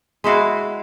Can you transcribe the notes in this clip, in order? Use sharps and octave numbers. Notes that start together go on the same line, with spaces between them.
G#3 E4 F#4 F5